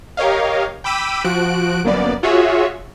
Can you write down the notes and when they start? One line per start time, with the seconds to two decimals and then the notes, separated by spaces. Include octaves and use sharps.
0.17 G4 A#4 C#5 D#5 F5
0.84 G5 B5 D6 E6 B6 D#7
1.24 F3 F#4 F#6 D7
1.84 G1 F#2 A#3 B3 D5
2.23 F4 F#4 G#4 C#5 E5